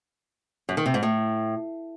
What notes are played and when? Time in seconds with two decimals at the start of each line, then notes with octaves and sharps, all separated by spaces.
0.69 F#2
0.77 D#3
0.86 C3
0.94 G#2
1.03 A2